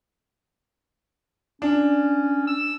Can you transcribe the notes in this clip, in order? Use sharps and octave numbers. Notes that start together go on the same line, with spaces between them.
C#4 D4
E6